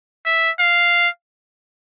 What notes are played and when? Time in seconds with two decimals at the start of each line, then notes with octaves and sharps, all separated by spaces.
0.26 E5
0.60 F5